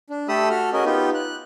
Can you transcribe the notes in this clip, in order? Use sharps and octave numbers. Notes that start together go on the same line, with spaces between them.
D4
A3 G4 A4 B5 D#6 E6
F#4 A4 F6
C#4 F#4 G#4 A#4 D#5
B3 D#4 F4 G4
F#6